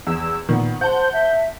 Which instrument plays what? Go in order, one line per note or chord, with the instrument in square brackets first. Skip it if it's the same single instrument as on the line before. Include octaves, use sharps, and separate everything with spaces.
[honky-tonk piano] E2 [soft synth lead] E6
[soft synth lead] A#2 [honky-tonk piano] D#3 B3
[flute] C5 [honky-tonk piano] F#5 A5 [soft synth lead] G6
[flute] E5